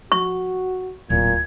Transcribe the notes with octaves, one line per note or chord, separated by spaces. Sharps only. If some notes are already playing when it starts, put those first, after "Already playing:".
F#4 C#6
D1 A#2 G#6